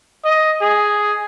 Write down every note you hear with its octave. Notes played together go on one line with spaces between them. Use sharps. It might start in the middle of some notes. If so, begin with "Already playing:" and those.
D#5
G#4